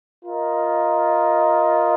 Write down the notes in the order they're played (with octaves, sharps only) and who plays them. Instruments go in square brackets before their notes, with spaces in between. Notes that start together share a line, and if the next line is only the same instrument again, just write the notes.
[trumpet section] F4 A#4 D#5